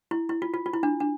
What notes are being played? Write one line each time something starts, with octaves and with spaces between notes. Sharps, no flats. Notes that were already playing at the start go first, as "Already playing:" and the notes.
E4
E4
F4
F4
F4
E4
D4
D4